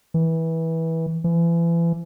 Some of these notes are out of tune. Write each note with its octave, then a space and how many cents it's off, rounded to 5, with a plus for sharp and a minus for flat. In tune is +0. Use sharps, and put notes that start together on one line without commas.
E3 -20
E3 +35